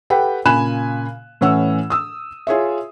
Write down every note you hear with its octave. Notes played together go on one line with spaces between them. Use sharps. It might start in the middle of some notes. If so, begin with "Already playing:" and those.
G4 A4 B4 F#5 G5
A#2 C#3 G#5 B5 F#6 E7
A2 E3 C#4 F#5 E6
D#6 E6
F4 G#4 C#5 E5